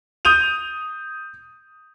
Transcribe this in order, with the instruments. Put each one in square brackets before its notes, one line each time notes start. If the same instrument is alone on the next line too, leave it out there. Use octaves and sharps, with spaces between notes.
[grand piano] D#6 G6 D#7 F7